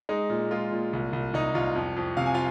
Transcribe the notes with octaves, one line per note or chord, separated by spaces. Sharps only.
G#3 D#4
A#2
G#3 F4
A#2
C2
C2
C2 D#4
C2 F4
F2
F2
C3 F5
G#5
F4 F5